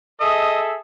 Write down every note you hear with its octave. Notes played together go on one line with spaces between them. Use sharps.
G#4 A4 D#5 E5